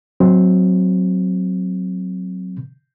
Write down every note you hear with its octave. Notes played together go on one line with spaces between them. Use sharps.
F#3 C4